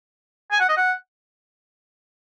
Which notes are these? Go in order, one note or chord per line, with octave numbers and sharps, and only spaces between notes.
G#5
F#5
D#5
F#5